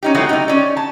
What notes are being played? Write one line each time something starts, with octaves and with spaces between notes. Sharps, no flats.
C#4 D#4 G4
F#3 G#3 A3 C4 E4 F#4
C3 D#4
C#4 D5
A5